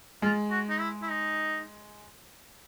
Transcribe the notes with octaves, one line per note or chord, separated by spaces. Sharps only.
G#3 F4
F#4
D#4
E4
E4
D#4